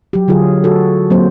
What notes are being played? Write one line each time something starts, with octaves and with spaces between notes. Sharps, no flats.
F#3 G4
D3 F#3 F4 G#4
F#4 A4
F#3 A#3 C4 C5